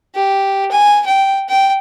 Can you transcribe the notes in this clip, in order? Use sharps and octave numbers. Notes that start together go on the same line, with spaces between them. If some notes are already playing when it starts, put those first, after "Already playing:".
G4
G#5
G5
G5